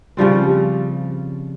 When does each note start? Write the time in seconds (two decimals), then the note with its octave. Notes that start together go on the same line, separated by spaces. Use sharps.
0.17 C#3 F3 G3 C4